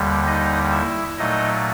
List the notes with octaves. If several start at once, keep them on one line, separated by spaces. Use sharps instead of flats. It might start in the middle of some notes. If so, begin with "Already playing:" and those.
Already playing: D#2 D3 G3
D#4 D#5
E4 E5
A#2 F#3 A3 D#4 D#5